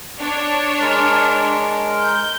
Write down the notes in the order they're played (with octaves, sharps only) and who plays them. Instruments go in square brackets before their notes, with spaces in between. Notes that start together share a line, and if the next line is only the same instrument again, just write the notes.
[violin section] D4 C#5
[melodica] G#3 A#4
[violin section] G6